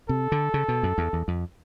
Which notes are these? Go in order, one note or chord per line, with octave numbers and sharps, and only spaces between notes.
C3 A4
D3
C#3
B2
F#2
E2
E2
F2